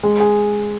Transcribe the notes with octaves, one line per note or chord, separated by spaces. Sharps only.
G#3
G#4